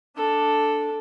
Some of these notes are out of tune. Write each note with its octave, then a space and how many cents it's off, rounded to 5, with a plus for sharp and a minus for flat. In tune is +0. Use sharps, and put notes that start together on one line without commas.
D4 +0 A4 +0